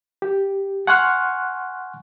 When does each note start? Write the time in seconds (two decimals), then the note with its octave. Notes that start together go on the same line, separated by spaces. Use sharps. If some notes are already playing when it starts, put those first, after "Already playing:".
0.22 G4
0.87 F#5 G#5 C6 C#6 F6 F#6